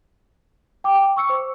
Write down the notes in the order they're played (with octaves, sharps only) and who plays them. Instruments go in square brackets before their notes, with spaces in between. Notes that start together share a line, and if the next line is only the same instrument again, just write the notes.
[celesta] G5 D6
C#6 E6 C#7
C5